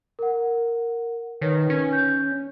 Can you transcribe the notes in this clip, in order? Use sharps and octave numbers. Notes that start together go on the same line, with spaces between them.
A#4 F#5
D#3 D#4 B4 C#5
C#4
G6